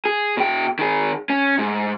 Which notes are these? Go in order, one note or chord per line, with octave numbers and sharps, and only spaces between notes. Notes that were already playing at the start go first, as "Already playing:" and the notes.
G#4
B2 G5
D#3 G#4
C#4
G#2